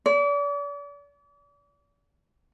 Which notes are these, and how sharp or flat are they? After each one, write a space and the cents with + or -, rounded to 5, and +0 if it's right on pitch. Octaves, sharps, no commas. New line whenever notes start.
D5 -40